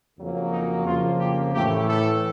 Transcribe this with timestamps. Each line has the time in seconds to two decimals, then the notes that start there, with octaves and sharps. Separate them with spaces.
0.18 F2 C#3 F#3 A#3
0.52 D#4
0.86 F2 C#3 F3 A#3 F4
1.20 G4
1.54 A2 E3 A3 G4
1.88 A4